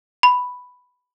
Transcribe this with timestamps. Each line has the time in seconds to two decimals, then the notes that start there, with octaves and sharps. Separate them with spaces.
0.23 B5